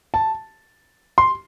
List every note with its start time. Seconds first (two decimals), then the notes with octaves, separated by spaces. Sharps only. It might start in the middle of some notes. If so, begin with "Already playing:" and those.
0.14 A5
1.18 C6